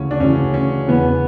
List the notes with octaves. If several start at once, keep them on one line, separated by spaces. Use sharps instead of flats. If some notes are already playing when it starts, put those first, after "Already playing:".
Already playing: D2 C#3 E3 C#4
D4
D2 C#3 E3 C#4
C#4
E2 C#3 E3 B3